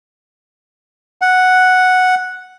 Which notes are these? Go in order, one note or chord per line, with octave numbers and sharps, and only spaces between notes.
F#5